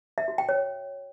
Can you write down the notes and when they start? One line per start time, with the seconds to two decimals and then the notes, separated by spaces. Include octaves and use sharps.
0.18 E5
0.28 F#4
0.38 G5
0.49 C#5